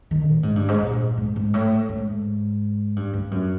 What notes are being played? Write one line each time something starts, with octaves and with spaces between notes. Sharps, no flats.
D#3
A2
G#2
G2
G#2
A#2
G#2
G#2
A2
G#2
G2
G2
F#2